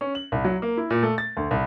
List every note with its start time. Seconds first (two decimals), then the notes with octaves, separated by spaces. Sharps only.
0.01 C#4
0.15 F#7
0.32 C2
0.45 F#3
0.62 A#3
0.77 E4
0.90 A#2
1.03 A3
1.18 A6
1.37 D2
1.51 C2